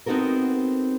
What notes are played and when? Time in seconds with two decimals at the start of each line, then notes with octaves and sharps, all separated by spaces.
0.06 B3 C4 D#4 F#4 A4 A#4